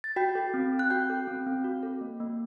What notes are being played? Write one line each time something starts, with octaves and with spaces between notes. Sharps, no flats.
A6
F#4 G5 G6
A4
C4
C4
F#6
F#4 G5 G6
A4
C4
C4
F#4
A4
A#3
A#3